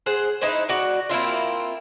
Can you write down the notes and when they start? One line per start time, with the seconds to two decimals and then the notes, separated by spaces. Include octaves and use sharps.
0.06 G#4 C5 F#5
0.41 D#4 E4 B4 C5
0.69 F#4 D5
1.09 A#3 C4 E4 F4